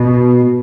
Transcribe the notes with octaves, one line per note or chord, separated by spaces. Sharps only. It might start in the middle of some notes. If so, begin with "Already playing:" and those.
Already playing: B2